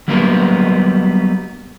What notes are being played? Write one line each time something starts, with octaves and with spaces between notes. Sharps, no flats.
F#3 G3 A#3 B3 A#4